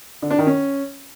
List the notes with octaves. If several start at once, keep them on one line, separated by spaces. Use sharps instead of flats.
D3
D4
D#3
C#4